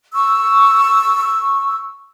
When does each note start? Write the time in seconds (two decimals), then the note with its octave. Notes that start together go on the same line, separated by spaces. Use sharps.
0.13 C#6 E6